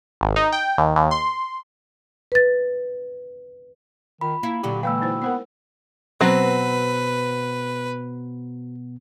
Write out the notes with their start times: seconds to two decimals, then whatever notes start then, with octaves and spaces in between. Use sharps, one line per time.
0.21 G#1
0.36 D#4
0.52 G5
0.78 D#2
0.96 D#2
1.11 C6
2.32 B4 A6
4.21 D#3 F4 B5
4.43 A#3 E4
4.63 A#2 D3 F#3 G4 D5
4.83 E3 G#3 A#3 F5 G5 B5 E6
5.02 D#4 E4 C5
5.22 B3 A#4 C5 F#5
6.21 B2 F#3 B3 C4 B4 C5